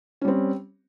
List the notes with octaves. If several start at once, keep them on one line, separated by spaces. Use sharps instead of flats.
G3 C4 C#4